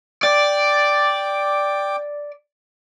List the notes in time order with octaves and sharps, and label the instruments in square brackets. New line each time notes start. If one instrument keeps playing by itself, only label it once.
[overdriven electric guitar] D5 [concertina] G5 D6